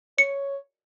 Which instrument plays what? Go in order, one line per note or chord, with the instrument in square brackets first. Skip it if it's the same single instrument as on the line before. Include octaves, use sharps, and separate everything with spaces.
[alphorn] C#5 [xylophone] C#7